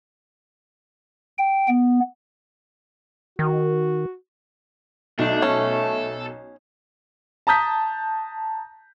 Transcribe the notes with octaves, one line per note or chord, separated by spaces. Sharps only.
G5
B3
D#3 F#4
B1 A3 D4
C#4 A4
A5 A#5 D#6 G6 B6